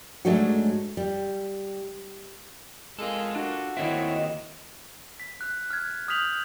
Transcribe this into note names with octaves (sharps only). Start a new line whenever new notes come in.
G#2 F#3 G#3 A3 D4 F#4
G3
G#3 F4 A4 A#4
D4 F#4
D#2 D#3 C4 E4 C#5 D#5 E5
B6
F#6
F6 G#6
D#6 F6 G6 B6 F7 F#7